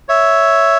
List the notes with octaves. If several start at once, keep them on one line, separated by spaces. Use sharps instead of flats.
C#5 E5